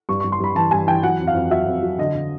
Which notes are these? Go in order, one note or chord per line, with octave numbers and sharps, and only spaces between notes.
G2 C#6
C#6
G2
C6
G2 B5
E3 A5
G2 G#5
E3 G5
F#3 F#5
F2
F5
F2
F#3 E5
F2
F#3
D3 D#5
D3